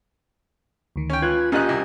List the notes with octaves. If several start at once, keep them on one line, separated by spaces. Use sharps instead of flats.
D2 D#3
C#4 G5
F4 B4 G#6
A#2 C#4 G4 D#5 F#6
C2